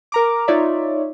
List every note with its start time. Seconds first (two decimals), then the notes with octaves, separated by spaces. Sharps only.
0.12 A#4 A#5 D6
0.48 D#4 F4 C#5 D5 E5